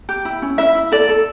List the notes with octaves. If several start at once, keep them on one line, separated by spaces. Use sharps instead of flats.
G4
E4
C#4
E4 E5
E4
A4 D5
A4